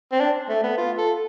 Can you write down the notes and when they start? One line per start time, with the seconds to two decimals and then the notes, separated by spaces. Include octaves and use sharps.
0.12 C4
0.20 D4
0.49 A3
0.64 B3
0.78 F4
0.98 A4